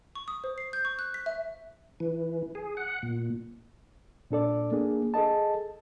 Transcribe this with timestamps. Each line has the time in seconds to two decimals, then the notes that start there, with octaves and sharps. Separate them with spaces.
0.15 C#6
0.28 D#6
0.44 C5
0.58 C7
0.73 G6
0.85 C#6
0.99 F#6
1.14 B6
1.26 E5
2.00 E3
2.55 G#4
2.77 F#5
3.03 A#2
4.31 A#2 D4 A4 D5
4.72 A#3 D4 G#4
5.14 G#4 A4 D#5 A5